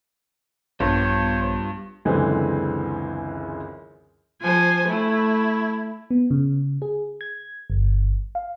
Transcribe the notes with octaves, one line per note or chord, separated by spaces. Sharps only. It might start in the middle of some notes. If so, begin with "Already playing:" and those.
A#1 G2 G3 B3 F4 C5 C#5
C#2 F#2 D3 E3 G#3 C4
F3 C5 G#5
A3 E4
B3
C#3
G#4
G#6
G1
F5